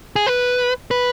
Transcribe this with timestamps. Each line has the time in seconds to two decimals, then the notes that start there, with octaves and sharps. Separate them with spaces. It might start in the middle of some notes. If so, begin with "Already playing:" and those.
0.16 G#4
0.27 B4
0.91 B4